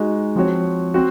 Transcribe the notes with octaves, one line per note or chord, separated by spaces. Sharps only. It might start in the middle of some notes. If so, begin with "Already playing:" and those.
Already playing: G#3 D#4 F#4
F3 C4 F#4 C#5
C4 F#4